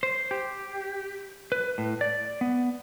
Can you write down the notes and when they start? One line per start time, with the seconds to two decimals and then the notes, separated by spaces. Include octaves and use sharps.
0.03 C5
0.31 G4
1.52 B4
1.78 A2
2.01 D5
2.41 B3